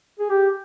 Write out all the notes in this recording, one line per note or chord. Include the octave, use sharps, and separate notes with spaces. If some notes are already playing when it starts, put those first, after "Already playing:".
G#4
G4